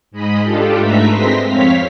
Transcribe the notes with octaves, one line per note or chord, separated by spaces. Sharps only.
G#2 G#3 D#5 B5
D4 F4 G4 A4
G#2 A3 B4 E5 A#5 B6
G#3 C4 C6 A#6 B6
F2 C4 C#5 F5 F6 B6